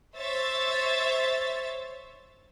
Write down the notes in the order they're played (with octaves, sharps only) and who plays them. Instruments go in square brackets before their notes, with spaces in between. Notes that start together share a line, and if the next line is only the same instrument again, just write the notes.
[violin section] C5 C#5 E5 A6